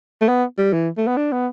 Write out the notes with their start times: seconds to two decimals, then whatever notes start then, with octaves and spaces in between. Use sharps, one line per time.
0.21 A3
0.28 B3
0.58 G3
0.73 E3
0.98 A3
1.07 B3
1.17 D4
1.32 B3